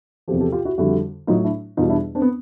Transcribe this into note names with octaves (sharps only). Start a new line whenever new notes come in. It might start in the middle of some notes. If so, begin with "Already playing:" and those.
E2 C3 F3 G4 A4
G4 A4
F4 G4
E4 F#4
F2 D3 G3 E4 F#4
A2 F#3 D#4 F4
D4 E4
E2 B2 G3 D#4 F4
D4 E4
C4 D4
B3